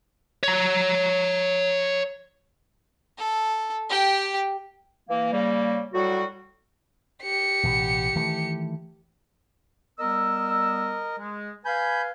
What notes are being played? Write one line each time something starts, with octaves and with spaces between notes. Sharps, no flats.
C#5 A#5
A4
G4 G5
E3 A#3
C#3 G3 A#3
A2 F#3 G3 F#4
G4 C#7
A1 B2 E3
D#3 E3 A3
G3 B3 A#4 D#5 E6
G#3
B4 F5 G#5 B5 G6